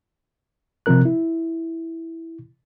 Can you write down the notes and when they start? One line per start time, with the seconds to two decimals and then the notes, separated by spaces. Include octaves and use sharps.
0.86 C3 F3 C4 A#4 F#6
1.05 E4